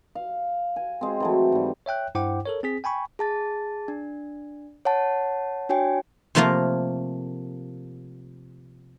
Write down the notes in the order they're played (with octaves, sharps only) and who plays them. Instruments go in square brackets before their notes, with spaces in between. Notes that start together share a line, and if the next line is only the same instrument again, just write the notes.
[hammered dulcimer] F5
G#5
G#3 C4
E3 F#3 A3
G#2 G3
[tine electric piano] C#5 E5 G5 F#6
G2 E4 C5 F#5 G5 D6
A4 A#4 C#5
C4 G#4 B6
G5 G#5 B5 C#6
[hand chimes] G#4 A5 A6
D4
C#5 F#5 A5
D4 F#4 C#5 G5 G#5
[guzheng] C3 F3 A3 A#3 A#4 F5